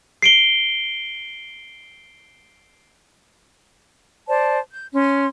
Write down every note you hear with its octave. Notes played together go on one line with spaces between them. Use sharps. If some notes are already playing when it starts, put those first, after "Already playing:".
C7 D7 G7
C5 D5 A5
G6
C#4 C6